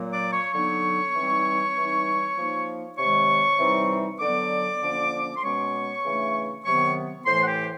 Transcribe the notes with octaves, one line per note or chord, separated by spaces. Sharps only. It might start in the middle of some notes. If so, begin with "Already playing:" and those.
Already playing: A#2 F#3 A#3
D5 D6
C#5 C#6
D3 F#3 B3 D#4 C#5 C#6
E3 G3 C4 D#4
E3 G3 C4 D#4
F3 A#3 D#4
C3 D#3 G#3 C#5 C#6
C3 E3 G3 C4 D#4
D3 F#3 B3 D4 D5 D6
D3 F3 A#3 C#4
C6
B2 G#3 C#4 C#5 C#6
C#3 E3 A3 D4
C3 D#3 F#3 B3 C#5 C#6
A2 E3 A3 C5 C6
F#5
G4 G5